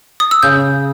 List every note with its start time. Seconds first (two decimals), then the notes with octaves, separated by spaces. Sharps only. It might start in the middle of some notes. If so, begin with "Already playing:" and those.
0.20 D#6
0.31 E6
0.43 C#3 G6